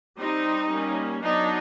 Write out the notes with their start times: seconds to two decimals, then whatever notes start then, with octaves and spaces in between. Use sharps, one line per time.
0.17 G3 C4 D#4
0.70 G3 A#3 C#4
1.23 F#3 B3 D4 D#4